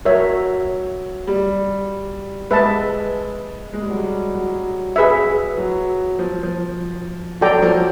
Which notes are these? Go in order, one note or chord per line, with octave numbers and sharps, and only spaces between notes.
F#3 A#4 C#5 E5
G3
G#3 B4 E5 A5
G#3
G3
F#3
G3
F#3
G#4 B4 E5
F#3
F3
F3
F#3 F#4 A4 D5 G5 A#5
F3